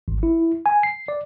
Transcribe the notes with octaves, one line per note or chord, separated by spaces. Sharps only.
G#1
E4
G#5
C7
D5